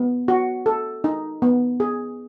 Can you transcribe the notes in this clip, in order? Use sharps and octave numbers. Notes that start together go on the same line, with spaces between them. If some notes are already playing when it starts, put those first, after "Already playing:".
Already playing: B3
F#4
A4
D#4
B3
G#4